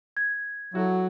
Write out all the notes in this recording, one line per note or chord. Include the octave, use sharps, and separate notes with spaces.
G#6
F#3 E4 F#4 A4